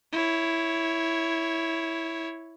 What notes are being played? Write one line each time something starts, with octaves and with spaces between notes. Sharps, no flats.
E4 C#5